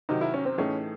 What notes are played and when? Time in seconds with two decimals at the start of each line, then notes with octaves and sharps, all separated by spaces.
0.09 C3 D#3 F#3 D#4
0.21 E4
0.34 C#4
0.45 C4
0.58 A2 E3 A3 C#4 D#4 G#4